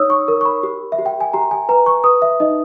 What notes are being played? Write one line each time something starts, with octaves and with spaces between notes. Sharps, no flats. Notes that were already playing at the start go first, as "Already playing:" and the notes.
Already playing: D#4 C#5 D#6 E6
C#6
A#4
C#6
B5
G4
E5
G4
G5
G#5
G4 A#5
G#5
B4 A#5
C#6
B4 D#6
E5
D#4 D#5